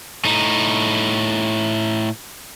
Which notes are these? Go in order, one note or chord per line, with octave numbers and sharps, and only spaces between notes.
A2 D#4